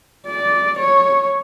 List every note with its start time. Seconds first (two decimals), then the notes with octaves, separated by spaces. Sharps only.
0.27 D5
0.79 C#5